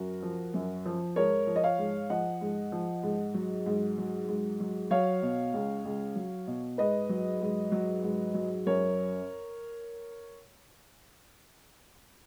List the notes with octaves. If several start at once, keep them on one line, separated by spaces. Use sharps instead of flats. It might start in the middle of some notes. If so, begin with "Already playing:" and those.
Already playing: F#2 F#4 A#4
F3
F#2
F3
G#2 A#4 C#5
F3
D#5
C#5 F5
G#2
F3 D#5 F#5
G#2
F3
G#2
F#3
G#2
F#3
G#2
F#3
F#3 C#5 F5
B2
C#2
C#2
F#3
B2
G#2 B4 D#5
F#3
G#2
F#3
G#2
F#3
F#2 A#4 C#5